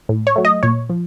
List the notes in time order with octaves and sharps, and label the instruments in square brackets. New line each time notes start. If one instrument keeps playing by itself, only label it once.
[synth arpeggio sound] A2
C#5
F#3 A3
D#5
A#2 C#5
F3